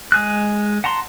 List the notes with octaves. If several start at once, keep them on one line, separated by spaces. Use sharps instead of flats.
G#3 G#4 F#6
F#5 A5 A#5 C6